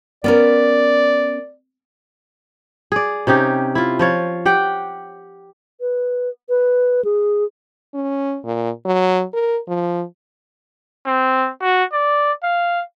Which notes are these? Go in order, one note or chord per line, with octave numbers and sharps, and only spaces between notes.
B3 C#4 A#4 D5
G#4 D5
C3 C#4 D#4 G4
E4 F4
F3 F4 C#5
G4 F#5 G5
B4
B4
G#4
C#4
A#2
F#3
A#4
F3
C4
F#4
D5
F5